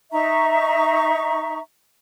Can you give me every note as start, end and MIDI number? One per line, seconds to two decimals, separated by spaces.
0.12 1.59 63
0.12 1.59 76
0.12 1.59 82
0.12 1.59 85